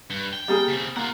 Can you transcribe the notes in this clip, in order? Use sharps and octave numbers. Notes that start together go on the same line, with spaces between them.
G2
G5
G3 A#3 G#4
C#3 C4
A#3 F4 F#5